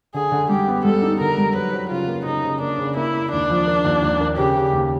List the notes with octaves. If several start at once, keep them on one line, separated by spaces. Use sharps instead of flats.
D3 G#4
D3
G3 G4
B3
G3 A4
D#4
D3 A#4
G3
F#3 B4
F#3
C#3 F4
A#3
C#3 D#4
C#3
A#3 D4
C#3
A#3 E4
A#3
D#2 D4
F3
A#3
D#2
D#2
A#3
C#3 G4
C#3
D#2